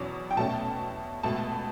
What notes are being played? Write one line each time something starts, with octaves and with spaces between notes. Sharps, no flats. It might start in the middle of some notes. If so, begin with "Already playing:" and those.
Already playing: E2 B2 F#3 C#4
G5
B2 A3 C#4 A5
C#2 B2 A3 A5